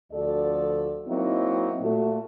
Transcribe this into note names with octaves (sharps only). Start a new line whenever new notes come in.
D2 D3 F3 F#4 A4 D5
D#3 F#3 A#3 C4 D#4 E4
A#2 A3 F#4